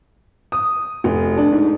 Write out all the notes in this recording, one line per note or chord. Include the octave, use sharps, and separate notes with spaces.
D#6
F1
D4
G#2